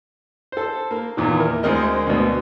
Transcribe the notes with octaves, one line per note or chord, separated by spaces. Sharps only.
A4 C5
A#3
E2 A#2 D#3
E4 A#4
D2 G#3 C4 A#4 D#5
D2 B2